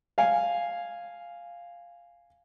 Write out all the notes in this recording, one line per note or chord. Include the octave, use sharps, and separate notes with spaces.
F5 G#5